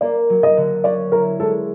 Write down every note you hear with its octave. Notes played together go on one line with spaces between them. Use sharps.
A#3 D5
F#3
D#5
D3
C#4 D5
E4 A#4
G#3 A4